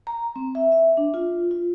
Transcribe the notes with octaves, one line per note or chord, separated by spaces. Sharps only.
A#5
C4
E5
E5
D4
F4
F4